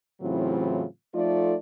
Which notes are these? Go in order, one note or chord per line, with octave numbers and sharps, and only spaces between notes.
A2 C#3 E3 F#3 C4 F4
F3 A3 D#4 F4 A4 D5